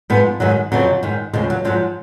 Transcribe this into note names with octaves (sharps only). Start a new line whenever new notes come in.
G#2 F3 B3
G#2 D#3 F#3
F2 C#3 F3 F#3
G#2 D#3
D#2 C#3 F3 G#3
F#3
G#2 F3 F#3